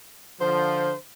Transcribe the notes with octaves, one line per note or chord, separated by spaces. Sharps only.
D3 F3 C5